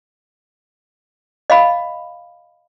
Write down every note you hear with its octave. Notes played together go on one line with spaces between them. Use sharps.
D#5 F5 B5